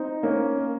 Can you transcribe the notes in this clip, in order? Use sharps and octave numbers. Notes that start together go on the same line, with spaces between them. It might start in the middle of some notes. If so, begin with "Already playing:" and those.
Already playing: C4 D#4
A#3 C#4